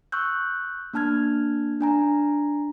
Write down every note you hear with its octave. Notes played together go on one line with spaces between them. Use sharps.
C#6 E6 F#6 G6
A#3 D4 A5 F6 G#6
D4 G#5 A#5